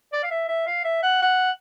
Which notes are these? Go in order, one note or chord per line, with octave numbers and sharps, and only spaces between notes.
D5
F5
E5
E5
F5
E5
F#5
F#5